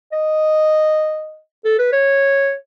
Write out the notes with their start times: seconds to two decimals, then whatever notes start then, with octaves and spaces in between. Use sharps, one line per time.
0.12 D#5
1.65 A4
1.79 B4
1.92 C#5